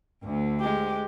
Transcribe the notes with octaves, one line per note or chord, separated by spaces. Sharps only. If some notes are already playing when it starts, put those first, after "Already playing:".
D2
G#3 G4